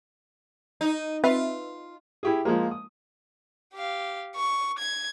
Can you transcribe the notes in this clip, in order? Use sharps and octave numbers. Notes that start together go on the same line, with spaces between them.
D#4
C4 F4 B4 E5
E4 G4 G#4
F3 G#3 A#3
D#6
G4 F5
C#6
G#6